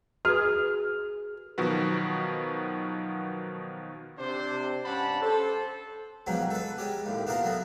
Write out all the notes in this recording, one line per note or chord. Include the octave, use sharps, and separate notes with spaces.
F#4 G#4 B4 F6
B2 D#3 F3 F#3 F#4 B4
C3 D4 C5
G2 C#4 D5 F#5 A5 B5
A4 C5
F2 G#2 B2 D#3 F#3 C#4
A4 B4
G#3 C#4 G4
D#2 A2
B3 D4 F4 A#4 F#5
F#3 A3 B3